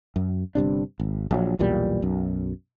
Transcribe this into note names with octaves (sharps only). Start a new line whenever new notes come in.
F#2
G1 G2 C3 D4
G#1
A#1 F#3
B1 E2 A#2 G3
B1 F#2